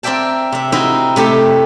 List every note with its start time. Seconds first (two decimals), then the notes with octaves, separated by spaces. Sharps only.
0.03 C4 A#4 D5 E5 G5 A5
0.52 C3 E5
0.72 C4 D#4 E4 F#4 A#4 E5
1.16 C3 A3 G4 A4